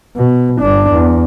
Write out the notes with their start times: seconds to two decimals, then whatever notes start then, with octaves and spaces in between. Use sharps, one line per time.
0.16 B2
0.61 G1 D4
0.92 E2